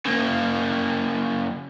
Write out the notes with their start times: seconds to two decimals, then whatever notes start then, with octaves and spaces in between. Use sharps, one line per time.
0.06 C#3 A#3